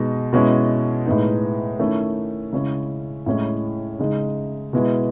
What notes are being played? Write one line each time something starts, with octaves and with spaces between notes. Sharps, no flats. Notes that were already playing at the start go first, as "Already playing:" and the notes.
Already playing: B2 G#3 D#4
B2 G#3 C#4 E4
A2 G#3 B3 D#4
D#3 A3 C#4 E4
C#3 G#3 C#4 E4
A2 G#3 C#4 E4
C#3 G#3 D#4
B2 G#3 B3 E4